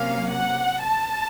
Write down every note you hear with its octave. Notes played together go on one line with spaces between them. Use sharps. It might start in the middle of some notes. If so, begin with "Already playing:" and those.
Already playing: C3 F#3 A#3 C#4 F5
F#5
A5